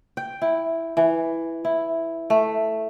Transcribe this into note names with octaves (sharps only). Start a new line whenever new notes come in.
G5
E4
E3
E4
A3